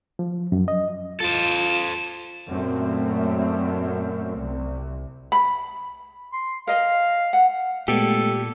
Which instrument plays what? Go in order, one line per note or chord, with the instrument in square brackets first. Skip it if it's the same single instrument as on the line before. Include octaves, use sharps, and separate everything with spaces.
[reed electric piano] F3
F#2
D#5
[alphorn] F4 [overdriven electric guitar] A4 C5
[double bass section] F#2 A#2 A3 C4
C2
[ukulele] B5
[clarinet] C6
[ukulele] A#4 D#5 [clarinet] F5
[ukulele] F#5
[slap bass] A#2 [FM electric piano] G#3 A3 B3 [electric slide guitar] G4 [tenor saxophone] A4